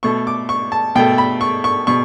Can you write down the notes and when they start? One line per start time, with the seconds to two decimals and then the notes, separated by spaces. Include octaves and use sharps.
0.03 B2 A3 C#6
0.27 D6
0.49 C#6
0.72 A5
0.95 B2 A3 G5
1.18 B5
1.41 C#6
1.64 C#6
1.87 B2 C#6